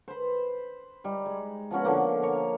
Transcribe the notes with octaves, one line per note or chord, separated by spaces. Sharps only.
B4 C5
G3 D#4
G#3
F3 B3 C#4 F#4
D3 F3 A#3 B3
A#4 C#5 F5